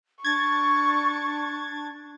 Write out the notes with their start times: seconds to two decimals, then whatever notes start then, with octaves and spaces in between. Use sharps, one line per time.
0.24 D4 C#6 G#6 A6